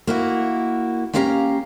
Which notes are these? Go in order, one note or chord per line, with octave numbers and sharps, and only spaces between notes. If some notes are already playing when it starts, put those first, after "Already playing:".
A#3 E4 F#4
A#3 C#4 E4 G4 F5 A#5